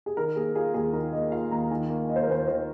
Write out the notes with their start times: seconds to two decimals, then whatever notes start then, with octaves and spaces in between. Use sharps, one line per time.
0.06 G#4
0.17 D#3 A#4
0.36 A#3 G#4
0.55 F4 G#4
0.74 D#2 G#4
0.93 D#3 A#4
1.13 A#3 D#5
1.32 F4 F5
1.51 D#2 A#5
1.71 D#3 G#5
1.90 A#3
2.09 F4 D#5
2.16 C5
2.23 A#4
2.28 D#2 C5
2.48 D#3 C5